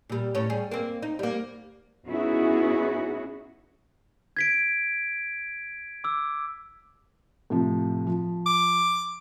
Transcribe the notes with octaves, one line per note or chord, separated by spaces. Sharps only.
A#2 G3
A2 C#4 C#5
G3 G#4
A#3 C4
D#4
G3 A#3
B3 C#4 D#4 E4 F#4 G#4
G#6 B6 D7
D6 E6
A2 C3 F3
F3
D6